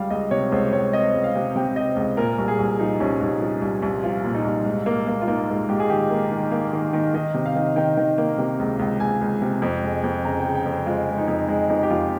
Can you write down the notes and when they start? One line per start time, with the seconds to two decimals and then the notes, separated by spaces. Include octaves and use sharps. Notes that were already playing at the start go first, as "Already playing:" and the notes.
Already playing: C#2 G3 F5
0.10 C#2 D#5
0.31 C3 C#5
0.52 C#2 C5
0.73 C#2 C#5
0.93 C4 D#5
1.14 C#2
1.24 F5
1.35 C3
1.56 C3 G5
1.76 C4 D#5
1.96 C#2
2.17 A#2 A#4
2.38 C2
2.48 G#4
2.59 C2
2.79 F3 D#4
3.00 C2 C#4
3.21 C2 D#4
3.41 F3
3.62 C2
3.82 C2
4.03 F3 F4
4.24 A#2
4.35 D#4
4.45 C2
4.66 G#2
4.86 A#3
5.07 A#3
5.22 F4
5.27 A#3 D#4
5.49 G#2
5.69 G#2 G4
5.80 G#4
5.90 D#3 G4
6.10 A#3
6.31 D#3
6.51 A#3
6.73 D#3
6.93 D#3
7.14 D#3 D#5
7.34 C3
7.46 F5
7.55 D#3
7.76 D#3 G5
7.97 D#3
8.18 A#3
8.38 C3
8.59 C#2
8.79 C#2
9.00 C#2 G#5
9.21 C#2
9.42 C3
9.62 F2
9.83 G#3
10.04 F2
10.24 C#3 A#5
10.40 G5
10.45 C#3
10.55 G5
10.66 F2
10.72 C5
10.86 G#3 F4
11.08 G#3
11.18 D#4
11.28 F2
11.48 G#3 D#4
11.69 F2 D#4
11.83 G4
11.90 F2 F4